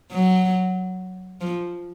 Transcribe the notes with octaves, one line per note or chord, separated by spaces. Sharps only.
F#3
F3